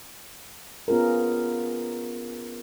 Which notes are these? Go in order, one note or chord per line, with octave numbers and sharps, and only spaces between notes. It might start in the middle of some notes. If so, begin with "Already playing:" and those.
B3 C#4 F4 G#4 A#4